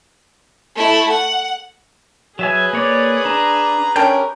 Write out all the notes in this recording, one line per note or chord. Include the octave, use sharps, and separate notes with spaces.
A3 E4
F#5
F#3 G#4 B4 E5 G#5
A#3 C#5 D5
D4 A#5
C#4 D4 G4 A#4 A#5 G6